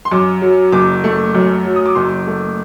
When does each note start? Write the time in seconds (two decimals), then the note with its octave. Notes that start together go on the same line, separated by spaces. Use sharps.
0.05 C6
0.11 F#2 D6
0.42 F#3
0.72 F#1 D6
1.04 A3
1.35 F#2
1.65 F#3
1.76 D#6
1.86 D6
1.95 F#1 C6
2.27 A3